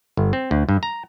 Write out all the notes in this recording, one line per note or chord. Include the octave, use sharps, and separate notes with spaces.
G1
C4
D2
G2
A#5